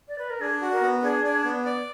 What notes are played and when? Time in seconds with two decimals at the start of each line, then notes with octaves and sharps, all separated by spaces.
0.08 D5
0.18 B4
0.30 A#4
0.41 D4 G#4
0.62 F#4
0.72 A#4
0.82 B3
1.03 D4 G#4
1.24 D4
1.45 B3
1.65 D5